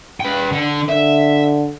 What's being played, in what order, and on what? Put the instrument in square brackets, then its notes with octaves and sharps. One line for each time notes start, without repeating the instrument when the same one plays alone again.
[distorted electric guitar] B4 G5
D3
[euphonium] D3 [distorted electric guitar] E5